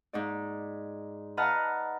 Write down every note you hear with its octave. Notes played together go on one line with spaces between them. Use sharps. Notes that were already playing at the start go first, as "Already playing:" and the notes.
G#2 D#4 D5
B4 D#5 F#5 A5 A#5 F6